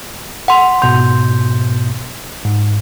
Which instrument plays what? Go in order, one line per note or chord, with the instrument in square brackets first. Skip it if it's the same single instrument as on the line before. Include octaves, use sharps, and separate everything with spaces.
[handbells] F#5 C6
[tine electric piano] G#2 B2 G6 [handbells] C6
[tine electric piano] G#2